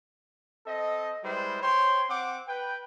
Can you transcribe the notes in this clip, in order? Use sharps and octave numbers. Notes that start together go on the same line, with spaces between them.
C4 A4 D#5
G3 G#3 E4 B4 C5
C5 C#5 G5 C6
C4 F#5 D6
B4 G5